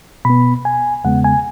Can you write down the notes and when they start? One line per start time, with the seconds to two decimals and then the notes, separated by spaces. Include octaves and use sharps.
0.25 B2 B3 B5
0.65 G#5
1.04 E2 C#3 G#3 B3 F#5
1.24 G#5